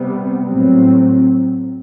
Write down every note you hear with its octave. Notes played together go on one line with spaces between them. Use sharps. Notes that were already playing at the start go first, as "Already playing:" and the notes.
Already playing: C3 G3 B3
A2 F#3 C4